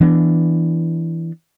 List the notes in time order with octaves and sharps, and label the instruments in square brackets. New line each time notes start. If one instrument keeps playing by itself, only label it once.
[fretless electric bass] E3 B3 D4